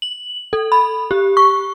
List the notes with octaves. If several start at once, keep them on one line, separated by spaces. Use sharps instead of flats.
F#7
A4
B5
G4
C#6